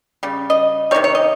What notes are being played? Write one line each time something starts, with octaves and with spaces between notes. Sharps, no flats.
C#3 G3
D#5
C3 D#3 G3 C#5
C#5
D#5